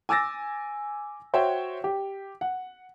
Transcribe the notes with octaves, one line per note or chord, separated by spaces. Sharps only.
G#5 D6 E6 A6 A#6
F#4 C5 C#5 E5 G5
G4
F#5